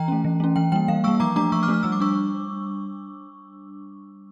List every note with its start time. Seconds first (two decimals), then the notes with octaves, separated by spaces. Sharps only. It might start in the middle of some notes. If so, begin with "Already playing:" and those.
Already playing: E3 G5 A#5
0.08 A3 C#4
0.25 E3
0.40 A3 C#4
0.56 E3 G5
0.72 G3 A#3 G5
0.88 E3 F5
1.04 G3 A#3 C#6 E6
1.20 F3 A#5 D6
1.36 A3 D4 A#5 D6
1.52 F3 C#6 E6
1.63 D6 F6
1.68 A3 D4
1.74 F6
1.83 G3 E6
1.92 D6
2.00 D4 C#6 E6